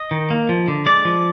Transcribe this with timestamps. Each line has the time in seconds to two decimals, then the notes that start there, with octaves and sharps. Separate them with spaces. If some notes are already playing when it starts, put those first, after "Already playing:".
Already playing: D#5
0.11 D#3
0.30 A#3
0.49 F3
0.68 D3
0.86 G#3 D5
1.05 F3